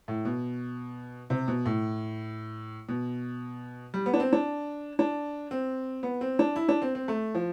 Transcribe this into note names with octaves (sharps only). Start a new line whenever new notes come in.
A2
B2
C3
B2
A2
B2
G3
B3
D4
C4
D4
D4
C4
B3
C4
D4
E4
D4
C4
C4
A3
F3